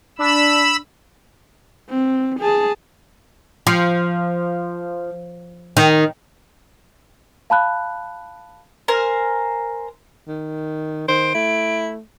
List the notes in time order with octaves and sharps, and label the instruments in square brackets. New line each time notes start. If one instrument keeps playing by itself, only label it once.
[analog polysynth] D4 [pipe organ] B5 E6
[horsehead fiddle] C4
G#4 A5
[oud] F3
D#3
[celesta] F5 A5 B5 F#6
[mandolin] A#4 C5 G#5
[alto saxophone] D#3
[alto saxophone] D#3 [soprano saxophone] C5 [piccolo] D7
[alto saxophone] A3 [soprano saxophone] E4